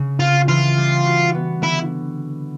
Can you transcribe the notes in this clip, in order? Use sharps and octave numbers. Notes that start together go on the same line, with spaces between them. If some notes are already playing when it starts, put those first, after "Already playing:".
Already playing: C#3
C4 F4
E3 F4
G3
F#4
B3
D3 E4